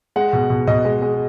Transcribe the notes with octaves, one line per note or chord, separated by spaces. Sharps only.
G#3 F#5
B2
B2
B2 D#5
G#3
G#3